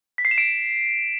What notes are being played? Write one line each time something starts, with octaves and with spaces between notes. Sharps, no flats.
B6
C7
E7
D7